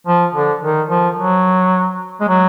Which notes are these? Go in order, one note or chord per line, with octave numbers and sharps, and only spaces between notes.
F3
D3
D#3
F3
F#3
G#3
F#3